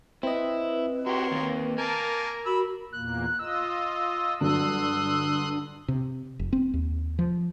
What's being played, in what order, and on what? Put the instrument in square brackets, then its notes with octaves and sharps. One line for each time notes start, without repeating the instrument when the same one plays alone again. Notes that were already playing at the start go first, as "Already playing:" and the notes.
[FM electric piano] C4 D#5 [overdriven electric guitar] E4 [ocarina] B4
[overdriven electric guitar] F#4 G4 [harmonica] A#4 C#5 C6
[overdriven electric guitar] D#2 A#3
[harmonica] A#3 G#5 A5 [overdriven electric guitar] A#4
[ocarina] F#4 [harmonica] B5 E6
[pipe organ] E2 A#2 A#3 [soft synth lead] F#6
[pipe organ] F4 D#5 [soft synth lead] E6
[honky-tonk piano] G2 D3 F#3 [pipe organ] C6 D#6 F#6
[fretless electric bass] C3
F1
C4
D#2
F3